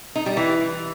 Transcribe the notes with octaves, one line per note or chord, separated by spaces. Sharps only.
D#4
G3
E3